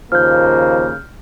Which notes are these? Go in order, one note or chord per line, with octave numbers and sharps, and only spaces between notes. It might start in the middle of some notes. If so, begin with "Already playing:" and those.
D#2 C#3 F3 A#3 F6 G6